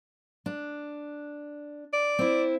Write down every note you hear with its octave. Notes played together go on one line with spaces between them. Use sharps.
D4
D5
C4 E4